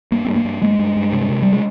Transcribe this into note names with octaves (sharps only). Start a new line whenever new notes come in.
G2 A#3
C4
G2
A#3
G2
G2 G#3
G2
G2
C3
C3
G3
G#3